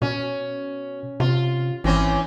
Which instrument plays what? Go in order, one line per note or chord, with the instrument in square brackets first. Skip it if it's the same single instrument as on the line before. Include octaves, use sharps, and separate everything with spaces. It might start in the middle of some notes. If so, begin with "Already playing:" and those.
[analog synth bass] B2 [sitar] C#4
[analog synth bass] C3 [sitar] F4
[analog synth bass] G#1 [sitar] E3 C4 C#4